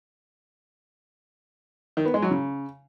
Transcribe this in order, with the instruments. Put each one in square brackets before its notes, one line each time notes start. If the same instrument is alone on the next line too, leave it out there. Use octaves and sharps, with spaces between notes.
[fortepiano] D#3
B3
G#3
F#3
C#3